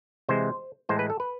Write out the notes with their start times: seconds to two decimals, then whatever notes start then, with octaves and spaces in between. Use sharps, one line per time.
0.29 C3 E3 G#3 C5
0.89 A2 E3 G#3 C5
0.99 B4
1.10 A4
1.20 B4